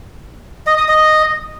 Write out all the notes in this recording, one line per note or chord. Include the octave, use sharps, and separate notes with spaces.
D#5
D#6
D#5